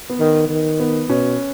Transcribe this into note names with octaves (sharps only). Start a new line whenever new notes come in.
B3
D#3
D#3
B3
B2 C#4